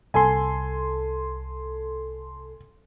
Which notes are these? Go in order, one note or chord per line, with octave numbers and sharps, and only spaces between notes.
C2 A4 G#5 C6